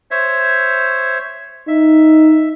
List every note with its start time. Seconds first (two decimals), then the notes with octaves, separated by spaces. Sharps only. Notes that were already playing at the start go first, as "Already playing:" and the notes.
0.11 C5 C#5 E5
1.68 D#4 E5